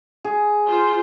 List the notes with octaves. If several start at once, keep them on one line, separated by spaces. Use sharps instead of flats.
G#4
F4 C5